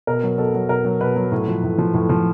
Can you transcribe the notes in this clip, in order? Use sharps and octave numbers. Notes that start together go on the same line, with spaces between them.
B2 A#4
F#3
B2 A4
F#3
B2 A#4
F#3
B2 B4
F#3
A2
F3
A2
F3
A2
F3